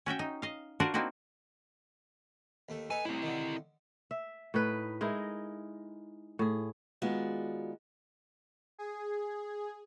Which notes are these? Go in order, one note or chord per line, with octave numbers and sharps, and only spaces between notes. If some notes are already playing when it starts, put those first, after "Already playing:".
C#4 F#4 E5 G5
D#4
D#5 F5
D4 F4 F#4 A#4 C5 D5
A#3 C4 D#4 E4 F#4
D#2 A3
D#4 A4 B4 G#5
A2 C4 E4
D3 D#3
E5
A2 D#4 B4
G#3 D#4 E4 A#4
A2 G#4
D#3 G#3 B3 F4 F#4 D5
G#4